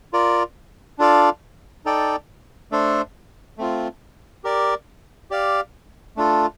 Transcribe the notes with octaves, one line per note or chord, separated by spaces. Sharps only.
F4 A#4 D5
D4 F4 A4 D5 F5
D#4 A4 D5 G5
A3 D4 A4 C5
A3 C4 F4
G4 A#4 D5
G4 D5 F5
A3 D4 F4 A4